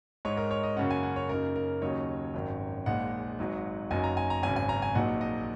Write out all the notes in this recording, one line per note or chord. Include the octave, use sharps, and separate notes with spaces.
G#2 G#3 D#4 C#5
A#4
C#5
D#5
F#2 C#3 A#3 C#4 F#5
G#5
F#5
C#5
F#2 C#3 A#3 D#4 A#4
A#4
D#2 C#3 F#3 D#4 C#5
G#1 F#2 D#3
A#1 A#2 G#3 D#4 F#5
G#1 G#2 F#3 D#4
F#1 F#2 F#3 D#4 G#5
A#5
G#5
A#5
G#1 F#2 C#3 G#5
G#5
A#5
G#5
A#1 A#2 F#3 D#4 F#5
D#5